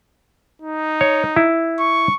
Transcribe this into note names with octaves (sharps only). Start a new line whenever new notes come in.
D#4
C#5
E4
C#6